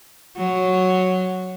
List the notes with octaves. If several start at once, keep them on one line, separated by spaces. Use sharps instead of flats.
F#3